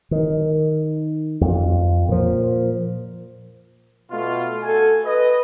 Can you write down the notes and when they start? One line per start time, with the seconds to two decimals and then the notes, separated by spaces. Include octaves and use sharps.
0.11 D#3
1.41 F2
2.09 A#2 F3
4.11 B2 A3 F4
4.63 F#4 A4 G#5
5.05 B4 D#5